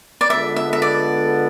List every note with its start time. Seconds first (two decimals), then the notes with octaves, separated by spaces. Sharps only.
0.21 D5
0.29 D3 G#3 B3 F4 A4 E5
0.56 E5
0.73 E5
0.82 D5